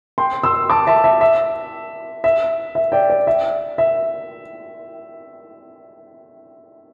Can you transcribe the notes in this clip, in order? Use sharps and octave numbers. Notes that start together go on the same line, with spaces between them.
G5 C6
C6 E6
A5 D6
E5 A5
E5 A5
E5
E5
E5
D5 G5
D5
E5
E5